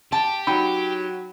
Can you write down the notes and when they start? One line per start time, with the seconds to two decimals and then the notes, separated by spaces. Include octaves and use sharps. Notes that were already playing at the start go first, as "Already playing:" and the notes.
0.12 G4 A5
0.47 F#3 D#4 G5 B5